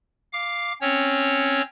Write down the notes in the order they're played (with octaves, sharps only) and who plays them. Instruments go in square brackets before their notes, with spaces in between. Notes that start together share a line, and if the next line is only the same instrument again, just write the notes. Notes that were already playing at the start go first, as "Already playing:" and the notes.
[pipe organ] F5 D6
C4 C#4 C#5